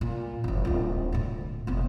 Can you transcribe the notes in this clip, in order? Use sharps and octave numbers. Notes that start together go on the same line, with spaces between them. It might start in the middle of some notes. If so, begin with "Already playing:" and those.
A#2
F#1 D#3
D1 F4
D2 A#2
F1 B3